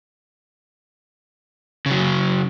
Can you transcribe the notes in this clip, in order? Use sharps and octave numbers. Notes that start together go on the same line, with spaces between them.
C#3 F#3